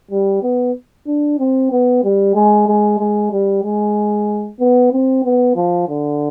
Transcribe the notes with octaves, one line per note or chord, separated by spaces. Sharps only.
G3
B3
D4
C4
B3
G3
G#3
G#3
G#3
G3
G#3
B3
C4
B3
F3
D3